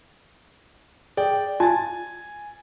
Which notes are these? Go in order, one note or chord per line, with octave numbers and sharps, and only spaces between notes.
G#4 D5 G5
F4 G#5 A5 A6